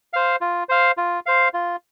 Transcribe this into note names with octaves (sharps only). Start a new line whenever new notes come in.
C5 F5
F4
C5 F5
F4
C5 F5
F4